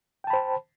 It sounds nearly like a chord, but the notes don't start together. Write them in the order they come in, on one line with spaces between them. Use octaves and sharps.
G5 A5 B5 C5